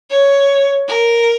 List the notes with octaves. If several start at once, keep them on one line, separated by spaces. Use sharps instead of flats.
C#5
A#4